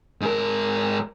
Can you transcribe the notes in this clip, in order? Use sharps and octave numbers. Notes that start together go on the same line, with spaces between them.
G#2 A#4